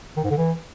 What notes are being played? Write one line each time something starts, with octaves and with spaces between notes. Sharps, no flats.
D#3
G#2
D3
E3